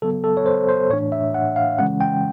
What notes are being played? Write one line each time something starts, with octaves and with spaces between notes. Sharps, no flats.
C#3 F#3 B3 A4
A4
C#5
C5
C5
A2 E3 A3 D4 C#5
E5
F#5
F5
C#3 E3 G#3 C#4 F#5
G5